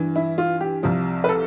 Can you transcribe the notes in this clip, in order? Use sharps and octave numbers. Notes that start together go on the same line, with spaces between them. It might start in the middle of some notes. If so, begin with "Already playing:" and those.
Already playing: G2 E3
E4
F4
G4
C2 C3 F3
B4
A4